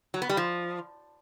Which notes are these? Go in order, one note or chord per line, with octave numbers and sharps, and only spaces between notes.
F#3
B3
G3
F3